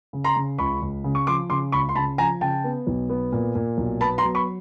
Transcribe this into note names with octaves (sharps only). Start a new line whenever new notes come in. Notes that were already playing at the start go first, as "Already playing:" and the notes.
C#3
A#5 C6
C#3
C#2 B5 C#6
C#2
C#3
C#6
F3 C6 D6
C#3 C6 D6
C#2 B5 C#6
C6
C#3 A5 B5
F3 G#5 A#5
C#3 G5 A5
B3
B1
B3
A#2
A#2
B1
B3 A5 B5
A#5 C6
F#3
B5 C#6